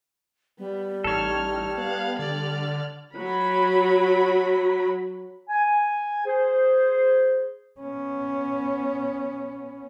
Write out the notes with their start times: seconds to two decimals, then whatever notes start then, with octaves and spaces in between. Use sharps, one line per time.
0.59 G3 B3
1.04 A1 D#4 A4 C#5 F6
1.77 B3 F5 F#6
2.19 D3 D5 F6
3.14 F#3 B5
5.49 G#5
6.26 G#4 C5
7.80 B3 C#4